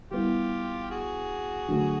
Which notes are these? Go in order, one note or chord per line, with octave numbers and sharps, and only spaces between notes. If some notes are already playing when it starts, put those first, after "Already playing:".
G3 B3 E4 F4 G4
F#4 G#4
D3 F#3 A3